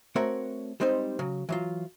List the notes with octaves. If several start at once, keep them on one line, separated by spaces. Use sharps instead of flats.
A3 C4 F#4 A#4 C#5 F#5
G3 G#3 C4 D#4 C5
C#3 F#3
E3 F#3 F4